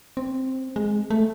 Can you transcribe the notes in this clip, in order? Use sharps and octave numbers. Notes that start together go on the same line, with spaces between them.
C4
G#3
A3